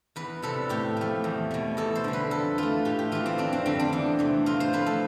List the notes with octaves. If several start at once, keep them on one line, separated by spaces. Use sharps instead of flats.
E2 B4
C3 G3 A4
A2 G4
F3 A3
E2
B2 A3
E2 A4
C5
D3 G3
B4
F2 A4
E3 A3 F4
A2 G4
G4
E3 A3 F4
C4
F2 D4
C4
D3 G3 C4
D4
E2
C3 E3 A3
A2 F4
C5
F3 A3 B4
A4